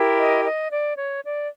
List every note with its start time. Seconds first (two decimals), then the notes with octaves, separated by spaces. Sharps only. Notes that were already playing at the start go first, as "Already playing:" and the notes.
Already playing: E4 G4 A#4
0.19 D#5
0.45 D#5
0.71 D5
0.97 C#5
1.24 D5